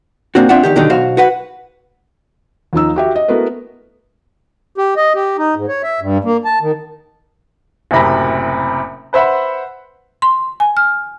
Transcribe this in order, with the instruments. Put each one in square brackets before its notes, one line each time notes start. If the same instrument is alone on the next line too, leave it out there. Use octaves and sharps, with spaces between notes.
[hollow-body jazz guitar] A#2 A#3 C4 D4 F#4
C4 D4 F4 E5 F#5
E2 G#2 D#3 G4
B2 D3 D#3 F#3 D#4 G4
B1 B2 F#4 C5 F5
F#4 B4 F#5
[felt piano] D#2 F3 D#4 E6
F#4 G4 E5
D#5
A3 B3 E4 F#4 A#4 B4
[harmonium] G4
D#5
G4
D#4
G#2
C#5
E5
G2
A#3
A5
D#3
[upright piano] F#1 F#2 A2 C3 B5 A#6
B4 C5 E5 F#5 B5
[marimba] C6
G#5
F6